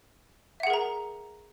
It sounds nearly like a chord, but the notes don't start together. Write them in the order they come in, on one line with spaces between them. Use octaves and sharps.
E5 F#5 G#4 A#4 A#5